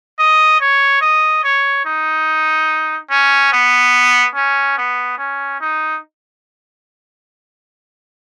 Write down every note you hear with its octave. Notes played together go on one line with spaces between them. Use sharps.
D#5
C#5
D#5
C#5
D#4
C#4
B3
C#4
B3
C#4
D#4